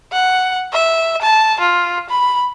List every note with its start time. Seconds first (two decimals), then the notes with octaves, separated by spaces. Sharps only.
0.13 F#5
0.73 E5
1.22 A5
1.60 F4
2.10 B5